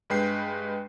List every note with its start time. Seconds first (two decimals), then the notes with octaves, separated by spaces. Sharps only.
0.10 G2 G#3 B4 G5 C7